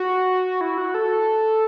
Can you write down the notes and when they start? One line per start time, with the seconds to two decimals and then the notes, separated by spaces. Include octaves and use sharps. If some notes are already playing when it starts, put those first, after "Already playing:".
Already playing: F#4
0.61 E4
0.78 F#4
0.94 A4